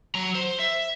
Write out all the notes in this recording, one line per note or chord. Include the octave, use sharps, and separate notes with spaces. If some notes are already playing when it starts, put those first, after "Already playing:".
F#3 A#5
C5
E5